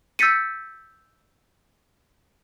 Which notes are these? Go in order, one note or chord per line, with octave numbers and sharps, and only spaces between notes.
E6 G6 A6 B6 C#7 D#7